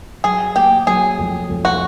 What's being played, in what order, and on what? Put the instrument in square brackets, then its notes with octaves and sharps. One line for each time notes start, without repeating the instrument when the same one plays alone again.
[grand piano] F#3 [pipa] G#4
[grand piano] A#3 [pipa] G4
[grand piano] F#3 [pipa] G#4
[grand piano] F2
F2
[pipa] F#4